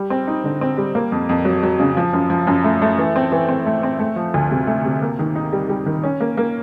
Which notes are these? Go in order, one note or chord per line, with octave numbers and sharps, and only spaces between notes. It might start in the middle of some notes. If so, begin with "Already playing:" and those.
Already playing: G3
C4
D#4
D3
C4
G3
A#3
F2
F2
F#3
F#3
C#3
F3
F#2
F3
F#2
A3
A3
E3
C4
E3
C4
A3
C4
A3
F3
D2
C3
A3
C3
A#3
D#3
D#4
G3
G3
D#3
C#4
A#3
A#3